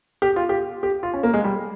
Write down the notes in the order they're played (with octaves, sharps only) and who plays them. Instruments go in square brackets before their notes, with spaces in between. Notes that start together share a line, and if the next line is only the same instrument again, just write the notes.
[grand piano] G4
F4
G4
G4
F4
C#4
A#3
G#3
G3